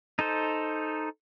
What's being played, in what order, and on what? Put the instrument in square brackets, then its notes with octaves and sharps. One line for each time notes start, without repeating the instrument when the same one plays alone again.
[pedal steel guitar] D#4 A4 C5